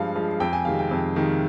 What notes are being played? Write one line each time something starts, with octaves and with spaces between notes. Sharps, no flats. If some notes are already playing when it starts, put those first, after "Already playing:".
Already playing: G2 F3 G#3 F5
F3 G#3
F2 G5
G#5
C3 D#3 G#3 F5
G5
F2
C3 D#3 G#3